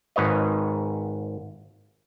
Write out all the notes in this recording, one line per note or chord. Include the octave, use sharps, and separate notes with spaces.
G#1 G#2 B4 C#5 D#5